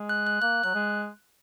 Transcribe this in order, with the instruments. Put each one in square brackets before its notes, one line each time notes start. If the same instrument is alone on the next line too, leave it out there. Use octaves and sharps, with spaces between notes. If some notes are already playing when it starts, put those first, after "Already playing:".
Already playing: [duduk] G#3
[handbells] F#6
F#6
[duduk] A#3 [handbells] F#6
[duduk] F#3 [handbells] F#6
[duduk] G#3